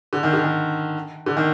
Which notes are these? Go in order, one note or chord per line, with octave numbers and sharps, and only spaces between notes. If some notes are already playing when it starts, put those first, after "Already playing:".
D3
D#3
D3
D#3
D3
D#3